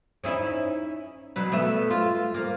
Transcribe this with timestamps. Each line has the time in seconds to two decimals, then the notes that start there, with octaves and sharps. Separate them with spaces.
0.24 C#4 D#4 E4
1.36 B2 F#3 B4
1.52 A3 B3 E5
1.91 F4
2.34 A#3